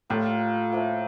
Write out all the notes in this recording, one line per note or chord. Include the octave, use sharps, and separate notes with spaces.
A2 G3 A#3 F4 A4
F3 A#3 E4 A4